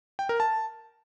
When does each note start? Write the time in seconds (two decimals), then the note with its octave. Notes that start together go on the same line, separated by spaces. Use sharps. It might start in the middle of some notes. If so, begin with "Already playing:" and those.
0.19 G5
0.29 A#4
0.40 A5